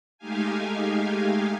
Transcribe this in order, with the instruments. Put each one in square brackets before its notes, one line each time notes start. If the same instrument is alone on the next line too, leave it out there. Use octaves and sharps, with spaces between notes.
[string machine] G#3 A3 D#4 G4 F5 G#5